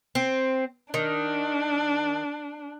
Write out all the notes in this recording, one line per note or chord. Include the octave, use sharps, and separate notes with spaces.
C4
D#3 D4